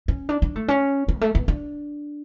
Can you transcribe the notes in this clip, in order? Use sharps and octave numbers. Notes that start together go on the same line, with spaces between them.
C#4
D4
D4
A3
C#4
C#4
G3
A3
B3
D4